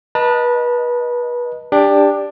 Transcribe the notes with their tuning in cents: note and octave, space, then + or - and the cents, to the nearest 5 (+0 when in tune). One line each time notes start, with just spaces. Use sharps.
B4 -30 D#5 +0 A5 +20
D4 +0 G4 +20